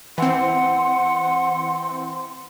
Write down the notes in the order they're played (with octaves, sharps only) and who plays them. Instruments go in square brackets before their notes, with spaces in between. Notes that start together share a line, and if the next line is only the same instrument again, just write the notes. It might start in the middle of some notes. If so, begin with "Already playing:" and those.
[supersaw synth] E3 C4 [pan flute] F#5 [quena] C6